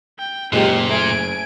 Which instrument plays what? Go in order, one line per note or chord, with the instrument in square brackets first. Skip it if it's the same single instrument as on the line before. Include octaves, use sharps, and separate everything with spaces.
[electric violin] G5
[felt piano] F#1 [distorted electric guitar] A#2 [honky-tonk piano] G#3 G4 [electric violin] A#3
[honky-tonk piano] A3 [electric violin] G#5 D7